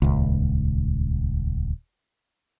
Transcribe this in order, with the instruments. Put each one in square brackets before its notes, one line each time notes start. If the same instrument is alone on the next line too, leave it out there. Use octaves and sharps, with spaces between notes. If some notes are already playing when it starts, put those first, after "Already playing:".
[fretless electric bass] D#1 C#2